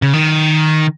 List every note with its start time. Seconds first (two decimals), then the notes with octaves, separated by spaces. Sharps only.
0.02 C#3
0.14 D#3